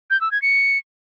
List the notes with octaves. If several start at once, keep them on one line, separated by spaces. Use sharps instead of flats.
G6
E6
G#6
C#7